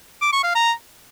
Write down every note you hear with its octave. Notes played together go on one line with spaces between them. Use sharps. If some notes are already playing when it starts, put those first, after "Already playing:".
D6
C#6
F5
A#5